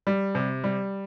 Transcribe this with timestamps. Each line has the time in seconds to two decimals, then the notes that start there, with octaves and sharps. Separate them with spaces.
0.07 G3
0.35 C3
0.64 G3